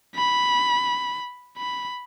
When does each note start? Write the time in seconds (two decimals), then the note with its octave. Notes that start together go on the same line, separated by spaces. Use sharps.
0.15 B5
1.57 B5